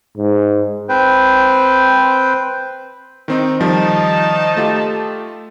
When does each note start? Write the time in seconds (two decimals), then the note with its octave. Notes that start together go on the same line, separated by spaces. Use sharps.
0.17 G#2
0.89 C4 B4 C5 G5
3.28 D#3 C4 D#4
3.60 D#3 F3 G3 D#4 D#5 A5
4.57 A3 F4 G4